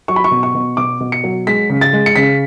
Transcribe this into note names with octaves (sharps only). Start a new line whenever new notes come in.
F#3 C#6
B5
C#6
B2
C#6
B2
B2 D6
B2
C#7
F#3
G#3 B6
C#3
A6
G#3
C#7
C#3 B6